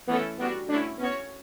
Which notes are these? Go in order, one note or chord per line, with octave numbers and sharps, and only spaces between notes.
E3 A3 B3 C#4 E4 A4
G3 B3 D4 F#4
D3 A3 C#4 D4 E4
B3 C#4 F#4 C#5